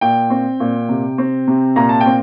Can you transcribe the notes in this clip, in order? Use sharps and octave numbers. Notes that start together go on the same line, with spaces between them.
A#2 G5
C4
A#2
C3
C4
C3
A#2 A#5
A5
G5
C4